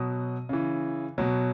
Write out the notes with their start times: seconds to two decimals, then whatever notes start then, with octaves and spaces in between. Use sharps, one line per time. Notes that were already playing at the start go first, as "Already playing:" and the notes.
Already playing: B2 F#3 D#6
0.49 C#3 E3
1.18 B2 F#3